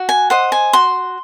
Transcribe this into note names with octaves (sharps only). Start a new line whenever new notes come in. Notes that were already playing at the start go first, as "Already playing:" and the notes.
Already playing: F#4
G#5
C5 D#5 F#5
G#5
F#4 C6